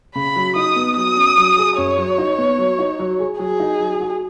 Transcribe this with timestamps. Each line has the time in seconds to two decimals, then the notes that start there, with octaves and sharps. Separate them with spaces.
0.16 C#3 B5
0.36 F#3
0.56 D#4 D#6
0.76 B3
0.96 F#3 D#6
1.17 C#4
1.37 F#3
1.58 G#4
1.78 F#2 C#5
1.98 F#3
2.18 D#4
2.38 B3
2.58 F#3
2.79 D#4
2.99 F#3
3.19 G#4
3.39 F#3 G#4
3.60 D#4
3.80 F#3
4.00 F#4